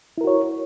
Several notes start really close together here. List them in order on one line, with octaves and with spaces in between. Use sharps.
E4 A#4 F#4 C#5